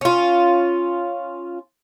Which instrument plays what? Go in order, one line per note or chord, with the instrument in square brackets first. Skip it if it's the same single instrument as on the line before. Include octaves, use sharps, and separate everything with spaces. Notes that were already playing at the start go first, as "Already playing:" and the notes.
[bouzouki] C#4 F4